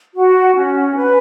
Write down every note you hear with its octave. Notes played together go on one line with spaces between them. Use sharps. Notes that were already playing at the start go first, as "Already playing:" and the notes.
F#4
C#4
B4